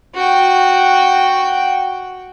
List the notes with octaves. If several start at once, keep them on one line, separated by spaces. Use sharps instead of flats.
F#4 G5